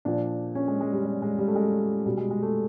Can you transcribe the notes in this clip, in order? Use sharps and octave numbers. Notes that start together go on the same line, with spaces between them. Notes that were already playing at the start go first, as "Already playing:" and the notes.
A#2 F3 D4
C#4
G#3
G#3
G3
G3
G#3
G3
A3
G#3
B2 G3
G#3
G#3
A3